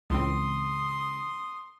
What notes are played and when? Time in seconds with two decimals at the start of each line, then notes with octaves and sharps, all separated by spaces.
0.10 C#2 A2 C#3 E3 G#3 C4 C6 D#6